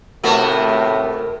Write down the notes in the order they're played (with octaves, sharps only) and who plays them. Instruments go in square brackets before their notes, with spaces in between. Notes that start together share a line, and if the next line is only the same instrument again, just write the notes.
[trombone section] D#2 A2 C3 [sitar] A3 B3 F#4 [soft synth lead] A#4